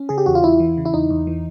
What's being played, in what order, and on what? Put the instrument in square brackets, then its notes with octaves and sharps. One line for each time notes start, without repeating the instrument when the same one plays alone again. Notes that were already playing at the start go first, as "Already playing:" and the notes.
Already playing: [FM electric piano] C#4
C#3 G#4
G4
E2 F#4
F4
E2 E4
E3
C#3
E4
E2 D#4
E2
E3